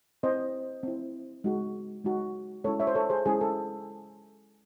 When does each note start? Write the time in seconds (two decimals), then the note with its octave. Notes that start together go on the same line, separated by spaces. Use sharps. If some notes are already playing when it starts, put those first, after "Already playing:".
0.23 C4 E4 C5 D#5
0.83 C4 E4
1.44 G#3 D#4 F#4
2.04 G#3 D#4 F#4
2.64 G#3 C#4 E4 A4 C#5
2.80 C#5 E5
2.87 C5
2.95 A4 C#5
3.10 G#4 C5
3.26 G#3 C#4 E4 G#4
3.41 A4